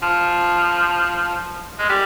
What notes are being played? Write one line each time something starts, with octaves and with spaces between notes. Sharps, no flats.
F3
G#3
G3